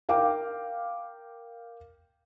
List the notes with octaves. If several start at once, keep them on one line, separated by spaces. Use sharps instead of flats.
A#4 F5 G5 D6